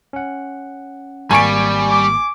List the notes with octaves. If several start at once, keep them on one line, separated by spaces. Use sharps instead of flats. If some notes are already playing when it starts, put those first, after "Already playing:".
C#4 F#5
G#1 G3 A#3 G#5 C#6 A6 D7
D6